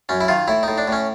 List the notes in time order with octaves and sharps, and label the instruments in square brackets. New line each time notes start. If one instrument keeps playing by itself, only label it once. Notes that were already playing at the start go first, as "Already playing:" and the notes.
[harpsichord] F#2 C#4
E4
D#3 F4
A2 E4
A2 D#4
D4
A2 C#4